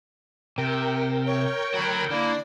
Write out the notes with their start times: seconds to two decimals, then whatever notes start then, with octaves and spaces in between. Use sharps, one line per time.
0.58 C3 A#4 G5
1.26 C#5
1.74 D3 F#3 F#4 B5
2.10 D3 A#3 E4 D5